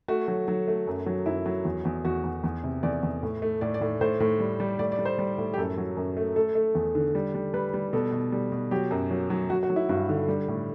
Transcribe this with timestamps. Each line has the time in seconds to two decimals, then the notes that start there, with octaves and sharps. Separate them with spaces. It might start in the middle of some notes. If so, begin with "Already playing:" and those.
0.08 A3 F#4
0.28 F#3
0.48 F#3
0.68 A3
0.87 F#2
1.06 F#3
1.26 F#2 E4
1.46 F#3
1.65 E2
1.85 E2
2.05 E2 F#4
2.24 E2
2.44 E2
2.64 C3
2.83 E2 D5
3.03 E2
3.23 A2
3.42 A3
3.61 A2 D5
3.74 D5
3.81 A2
4.01 A2 C5
4.20 A2
4.40 G3
4.60 G3
4.79 A2 D5
4.92 D5
4.99 G3
5.05 C5
5.19 G3
5.38 A2
5.54 G4
5.58 F#2 A4
5.78 F#3
5.97 F#2
6.17 A3
6.36 A3 A4
6.55 A3
6.75 E2
6.95 D3
7.15 G3
7.34 G3
7.54 G3 B4
7.74 G3
7.93 B2 A4
8.12 B2
8.32 G3
8.52 B2
8.71 F#3 G4
8.91 F#2
9.11 F#3
9.30 F#3
9.50 F#3 F#4
9.63 F#4
9.70 F#3
9.76 E4
9.89 G2 F#4
10.09 D3
10.28 G3
10.48 A2